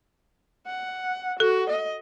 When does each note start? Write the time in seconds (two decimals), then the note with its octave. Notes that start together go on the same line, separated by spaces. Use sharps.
0.67 F#5
1.40 F#4 A4
1.70 D#5